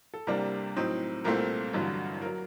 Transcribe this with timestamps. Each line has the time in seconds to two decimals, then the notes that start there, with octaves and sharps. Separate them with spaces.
0.14 A4
0.27 C2 C3 G3 A#3 D4 A#4
0.76 A2 F#3 C4 D#4
1.24 C2 A#2 A3 C4 A#4
1.73 A1 G2 D3 F#3
2.22 F#3 A#4